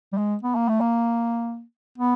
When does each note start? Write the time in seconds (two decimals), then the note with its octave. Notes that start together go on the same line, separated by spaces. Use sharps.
0.13 G3
0.17 G#3
0.43 B3
0.56 A#3
0.69 A3
0.80 A#3
1.98 B3